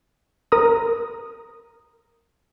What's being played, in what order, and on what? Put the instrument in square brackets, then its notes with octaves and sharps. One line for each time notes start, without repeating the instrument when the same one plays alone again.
[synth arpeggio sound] A#4 A#5 D#6